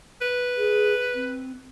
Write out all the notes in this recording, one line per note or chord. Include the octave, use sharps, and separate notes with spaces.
B4
G#4
C4